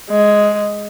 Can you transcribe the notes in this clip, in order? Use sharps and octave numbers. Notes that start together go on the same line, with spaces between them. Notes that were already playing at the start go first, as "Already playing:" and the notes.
G#3